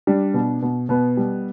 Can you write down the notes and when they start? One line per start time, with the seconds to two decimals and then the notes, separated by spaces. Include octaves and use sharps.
0.07 G3 D4
0.34 B2
0.62 B2
0.89 B2 B3
1.17 G3